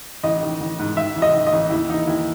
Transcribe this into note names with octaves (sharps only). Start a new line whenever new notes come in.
A1 D#5
D#3
A1
G#2
D#3 E5
A1
D#5
D#3
D#5
A1
D#2 E4
E3 D#4
D#2 E4